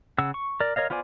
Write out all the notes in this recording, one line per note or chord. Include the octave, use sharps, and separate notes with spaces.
C#3 F#5 E6
C#6
A#4 D5
A#4 C#5 D#5 F5
B3 F4 C5 D5 G#5